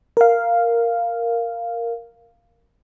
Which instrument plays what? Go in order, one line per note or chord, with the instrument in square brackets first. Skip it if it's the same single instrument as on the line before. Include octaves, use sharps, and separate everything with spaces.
[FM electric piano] A#4 F5